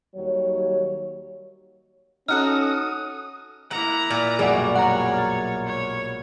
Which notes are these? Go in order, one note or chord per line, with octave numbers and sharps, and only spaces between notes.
D#2 F#3 G3 C#5
C#4 D#4 F#4 A4 D#6 F6 F#6
A#3 E4 F#5 A#5
A#2 F#5
B1 F#2 G3 G#3 G#4 D5 F#5
C#5 F#5 A#5
F6 A6
C#5